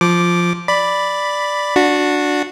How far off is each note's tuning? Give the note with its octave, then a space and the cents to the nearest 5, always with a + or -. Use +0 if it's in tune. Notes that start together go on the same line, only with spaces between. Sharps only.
F3 +0 D6 +0
D5 +0 B5 +0
D4 +0 F#4 -15